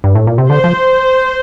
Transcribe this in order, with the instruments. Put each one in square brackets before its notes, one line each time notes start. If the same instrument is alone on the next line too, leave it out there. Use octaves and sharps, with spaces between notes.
[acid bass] G2
A2
A#2
C3
[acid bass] D3 [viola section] C5
[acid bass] F3